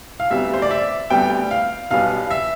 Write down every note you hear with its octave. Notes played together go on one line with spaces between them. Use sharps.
F5
D2 C3 G3 B3 E5
C5
D5
E5
D2 C3 G3 B3 G5
F5
B1 B2 G3 B3 F5
E5